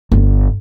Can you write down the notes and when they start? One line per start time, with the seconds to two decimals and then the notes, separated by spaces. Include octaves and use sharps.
0.12 G1